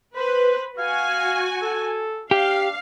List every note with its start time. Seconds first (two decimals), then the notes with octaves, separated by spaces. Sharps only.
0.16 B4 C5
0.79 F#4 F5 G#5
1.62 A4
2.31 D4 G4 F5